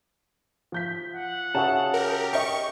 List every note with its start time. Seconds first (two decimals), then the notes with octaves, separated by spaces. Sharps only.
0.72 F3 G6 B6
1.16 F#5
1.55 C#3 F#4 G#4 E5 A5
1.94 G4 A#4
2.33 D#5 G5 C#6